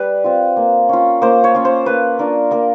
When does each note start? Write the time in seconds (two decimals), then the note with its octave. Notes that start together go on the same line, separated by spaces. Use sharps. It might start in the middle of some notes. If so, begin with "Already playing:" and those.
Already playing: G3 B4
0.24 C4 F4
0.57 A#3
0.89 C#4 F4
1.22 A#3 C5
1.44 C#5
1.55 C#4 F4
1.65 C5
1.86 A#3 B4
2.19 D4 F4 A#4
2.51 A#3 A#4